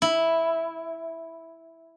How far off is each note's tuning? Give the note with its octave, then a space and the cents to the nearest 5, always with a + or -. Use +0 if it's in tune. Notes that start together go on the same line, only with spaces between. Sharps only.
E4 -5